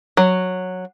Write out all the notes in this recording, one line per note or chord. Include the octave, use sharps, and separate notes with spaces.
F#3